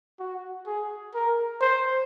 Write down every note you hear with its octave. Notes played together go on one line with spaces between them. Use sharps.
F#4
G#4
A#4
C5